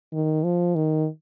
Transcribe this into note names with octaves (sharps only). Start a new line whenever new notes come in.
D#3
F3
D#3